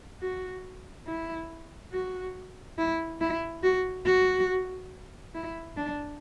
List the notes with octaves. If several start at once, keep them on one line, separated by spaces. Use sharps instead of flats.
F#4
E4
F#4
E4
E4
F#4
F#4
E4
D4